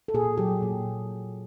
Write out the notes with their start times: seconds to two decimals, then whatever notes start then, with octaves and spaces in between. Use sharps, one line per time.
0.08 A4
0.14 A#2 G#4
0.38 F#3 G4
0.63 A#2